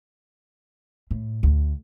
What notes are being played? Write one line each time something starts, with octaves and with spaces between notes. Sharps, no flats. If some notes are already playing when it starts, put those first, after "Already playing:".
A2
D2